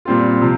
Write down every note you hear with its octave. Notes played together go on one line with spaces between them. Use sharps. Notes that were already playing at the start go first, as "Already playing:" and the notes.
A#2 G3 C4 F4
C3 F3